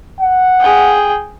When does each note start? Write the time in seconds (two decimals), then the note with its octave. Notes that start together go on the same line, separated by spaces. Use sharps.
0.21 F#5
0.60 G#4 G5